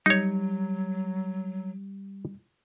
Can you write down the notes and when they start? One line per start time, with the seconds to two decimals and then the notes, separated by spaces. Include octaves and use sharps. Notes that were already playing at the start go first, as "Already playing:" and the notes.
0.06 F#3 G3 D#4 C#5